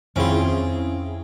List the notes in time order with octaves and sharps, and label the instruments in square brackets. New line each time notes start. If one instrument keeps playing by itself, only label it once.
[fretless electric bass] F2 D#3 [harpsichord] C4 F4 [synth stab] C#4 E4 G#4